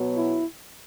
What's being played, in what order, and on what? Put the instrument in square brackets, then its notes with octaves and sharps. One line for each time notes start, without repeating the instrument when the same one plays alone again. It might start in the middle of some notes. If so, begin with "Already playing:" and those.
Already playing: [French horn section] B2 F#3 B3
E4